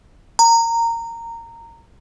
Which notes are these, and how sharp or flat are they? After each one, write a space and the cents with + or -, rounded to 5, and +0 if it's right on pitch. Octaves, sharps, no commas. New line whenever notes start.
A#5 -15